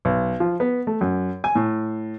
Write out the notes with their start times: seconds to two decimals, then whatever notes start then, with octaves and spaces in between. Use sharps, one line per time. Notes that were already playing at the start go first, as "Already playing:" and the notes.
0.05 B1
0.40 F3
0.60 B3
0.87 A3
1.01 F#2
1.44 G#5
1.55 A2